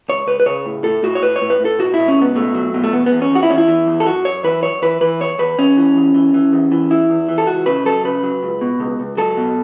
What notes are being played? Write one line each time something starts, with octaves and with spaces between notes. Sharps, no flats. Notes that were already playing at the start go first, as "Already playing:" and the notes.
C#2 C#5
C#2 B4
B4
C#3 C#5
A2
A2 A4
A2 F#4
C#5
A2 B4
C#5
A2
B4
A2
A4
B2 F#4
B2 E4
C#4
C#2
B3
B2 A3
F#3
B2
A3
E2 B3
B3
E2
C#4
E2 F#4
E4
E2 C#4
E4
E3
E2
A4
F#2 F#4
F#2 C#5
E3 B4
F#2 C#5
E3 B4
E3 B4
E2 C#5
E2 B4
E2 C#4
E3
E2
E3
E3
E2
E3
E2 E4
E2
E3
A4
C#2 F#4
C#3 B4
F#3 A4
C#3 B4
F#3
C#2
B2
C#2
C#2
F#3 A4
B2